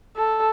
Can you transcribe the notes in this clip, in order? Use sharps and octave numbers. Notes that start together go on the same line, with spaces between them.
A4